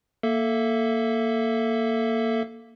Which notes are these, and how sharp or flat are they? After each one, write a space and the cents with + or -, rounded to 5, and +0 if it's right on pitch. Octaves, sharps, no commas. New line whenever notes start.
A#3 +0 A4 +0 E5 +5